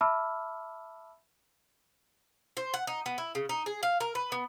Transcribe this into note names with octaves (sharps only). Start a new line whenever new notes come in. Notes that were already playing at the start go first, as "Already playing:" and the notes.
E5 A5 B5 D6 E6 F6
C5
F#5
D#4
B3
E4
C#3
D#4
G#4
F5
A#4
B4
B3